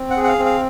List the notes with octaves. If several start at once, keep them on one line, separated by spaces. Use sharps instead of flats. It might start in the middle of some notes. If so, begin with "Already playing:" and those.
Already playing: C4
F#5
G#4
F#5
F5
C4
F5